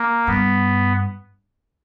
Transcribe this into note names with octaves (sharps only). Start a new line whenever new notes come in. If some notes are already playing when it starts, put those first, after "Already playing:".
Already playing: A#3
G2 B3